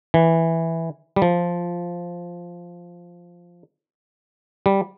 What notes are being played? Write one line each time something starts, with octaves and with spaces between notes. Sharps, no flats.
E3
G3
F3
G3